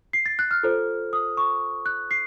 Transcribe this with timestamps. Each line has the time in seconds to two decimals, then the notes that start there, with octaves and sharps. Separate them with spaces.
0.13 C7
0.26 A6
0.39 F#6
0.51 F6
0.63 F4 A4 C5
1.13 D#6
1.37 C#6
1.86 F#6
2.11 C7